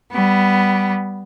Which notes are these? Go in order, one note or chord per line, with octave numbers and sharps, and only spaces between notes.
G3 B3